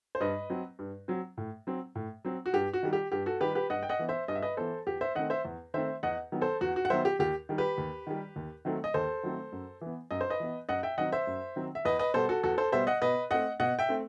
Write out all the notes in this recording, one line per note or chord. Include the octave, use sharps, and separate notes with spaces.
C5
G2 B4 D#5
F#3 C4
G2
F#3 C4
A2
F#3 C4
A2
F#3 C4
F#4
G2 G4
F#4
D#3 G3
G4
G2 G4
F#4 A4
D#3 G3 G4 B4
G4 B4
G2 D#5 F#5
G5
D#5 F#5
E3 B3
C5 E5
G2 D#5
E5
B4 D#5
E3 B3 A4 C5
E2 G4
C5 E5
D#3 A3 C4 D#5 F#5
C5 E5
E2
D#3 A3 C4 C5 E5
E2 D#5 F#5
D#3 F#3 B3
A4 C5
E2 F#4
F#4
F#5
D#3 F#3 B3 C5 E5
G4
D#2 G4
D#3 G3
G4 B4
D#2
D#3 G3
D#2
D#3 F#3 A3 C4
D#5
D#2 A4 C5
D#3 F#3 A3 C4
F#2
E3 B3
F#2 D#5
C5
B4 D#5
E3 B3
F#2 D#5 F#5
E5 G5
D#3 F#3 C4 D#5 F#5
C5 E5
F#2
D#3 F#3 C4
E5
E2 B4 D#5
B4 D#5
B2 G3 B3 A4 C5
F#4 A4
E2 F#4 A4
A4 C5
B2 G3 B3 C5 E5
D#5 F#5
B2 B4 D#5
A3 C4 D#5 F#5
B2 D#5 F#5
E5 G5
A3 C4